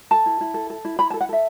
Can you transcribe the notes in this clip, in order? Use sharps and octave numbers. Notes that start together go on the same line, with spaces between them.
A4 A5
E4
E4
A4
A4
E4
E4 B5
A5
A4
F#5
A4 E5